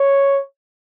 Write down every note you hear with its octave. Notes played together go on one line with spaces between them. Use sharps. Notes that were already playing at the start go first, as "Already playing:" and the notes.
Already playing: C#5